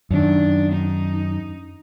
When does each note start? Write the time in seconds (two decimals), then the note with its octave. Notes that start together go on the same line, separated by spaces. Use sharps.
0.11 F#2 D#3 D4
0.72 D#4